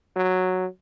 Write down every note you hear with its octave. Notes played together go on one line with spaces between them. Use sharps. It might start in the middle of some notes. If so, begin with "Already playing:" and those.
F#3